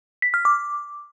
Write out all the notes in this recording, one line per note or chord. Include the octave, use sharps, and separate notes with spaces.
B6
F6
D6